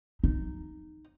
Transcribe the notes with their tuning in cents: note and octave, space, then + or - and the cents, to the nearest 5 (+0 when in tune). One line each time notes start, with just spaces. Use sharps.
D#4 -10